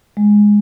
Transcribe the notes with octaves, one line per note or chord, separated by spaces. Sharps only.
G#3